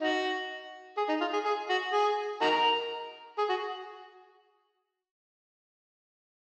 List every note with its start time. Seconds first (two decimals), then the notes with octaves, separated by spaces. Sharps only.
0.01 D#4 F#4
0.98 G#4
1.09 D#4
1.21 F4
1.33 G#4
1.45 G#4
1.70 F#4
1.93 G#4
2.41 D#4 F#4 A#4
3.38 G#4
3.49 F#4